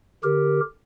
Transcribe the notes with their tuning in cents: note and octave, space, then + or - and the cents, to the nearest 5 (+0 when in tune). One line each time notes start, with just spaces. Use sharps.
D3 +0 G4 +0 A#4 +0